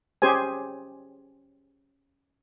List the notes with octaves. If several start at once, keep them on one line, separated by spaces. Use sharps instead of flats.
C#4 G4 G#4 C5 G#5